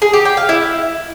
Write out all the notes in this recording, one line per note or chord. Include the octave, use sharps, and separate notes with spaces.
G#4
G4
G5
F5
E4